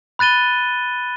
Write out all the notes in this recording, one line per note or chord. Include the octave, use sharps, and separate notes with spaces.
B5 F#6 A6 D#7 G7